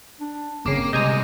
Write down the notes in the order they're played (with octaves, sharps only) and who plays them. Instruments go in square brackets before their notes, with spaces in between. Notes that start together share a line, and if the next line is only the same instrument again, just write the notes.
[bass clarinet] D4
[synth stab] G1 C#3 [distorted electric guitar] A#3 [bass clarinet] C4 [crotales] D6 C7
[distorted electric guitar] C2 G#3 [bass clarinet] C3 [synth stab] D#5 G#5 A#5 [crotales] G6 D#7